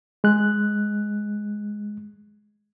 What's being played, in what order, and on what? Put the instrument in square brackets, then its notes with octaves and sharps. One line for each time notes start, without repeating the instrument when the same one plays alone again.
[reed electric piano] G#3 F#6